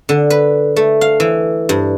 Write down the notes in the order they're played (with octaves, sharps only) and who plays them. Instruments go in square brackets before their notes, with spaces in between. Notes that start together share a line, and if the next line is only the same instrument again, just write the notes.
[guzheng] D3
B4
A3
F5
E3
G2